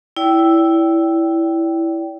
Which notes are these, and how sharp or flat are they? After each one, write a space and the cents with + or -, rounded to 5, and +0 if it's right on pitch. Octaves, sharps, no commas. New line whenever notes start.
E4 +0 D5 -35 G5 -15